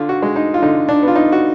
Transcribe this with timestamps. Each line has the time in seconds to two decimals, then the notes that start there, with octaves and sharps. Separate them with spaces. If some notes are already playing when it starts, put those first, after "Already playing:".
Already playing: D3 F4
0.09 F#4
0.22 G#3
0.36 D#4
0.54 F4
0.62 D3 D#4
0.89 D4
1.03 B3 F4
1.16 D#4
1.32 F#4